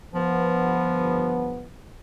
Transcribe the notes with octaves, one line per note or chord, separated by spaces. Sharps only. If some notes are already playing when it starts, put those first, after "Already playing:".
G1 F3 B3